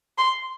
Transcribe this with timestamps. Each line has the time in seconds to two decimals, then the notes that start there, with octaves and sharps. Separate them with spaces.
0.18 C6